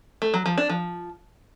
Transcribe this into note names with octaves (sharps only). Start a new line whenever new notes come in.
A3
F#3
F3
D4
F3